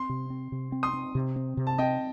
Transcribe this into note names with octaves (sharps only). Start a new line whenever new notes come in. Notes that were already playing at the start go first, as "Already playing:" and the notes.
Already playing: C4 C6
C3
C4
C3
C4
C6 D#6
C4
C3
C4
C3
A5
C4 D#5 G5